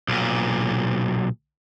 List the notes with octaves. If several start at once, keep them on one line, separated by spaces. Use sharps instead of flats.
B1 A#2